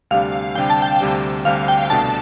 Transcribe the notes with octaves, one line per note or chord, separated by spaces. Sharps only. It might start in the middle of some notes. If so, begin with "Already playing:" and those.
D2 C3 G3 D4 G4 F5
D2 C3 G3 D4 G4 G5
A5
G5
D2 C3 G3 D4 G4
D2 C3 G3 D4 G4 F5
G5
C2 B2 A3 D4 A5